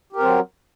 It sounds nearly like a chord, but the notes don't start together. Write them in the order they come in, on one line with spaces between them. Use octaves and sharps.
G4 A#4 C4 F#3